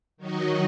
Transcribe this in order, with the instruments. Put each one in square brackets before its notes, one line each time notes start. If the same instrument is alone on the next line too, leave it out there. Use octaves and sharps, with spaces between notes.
[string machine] D#3 F#3 D#4 F#4 D#5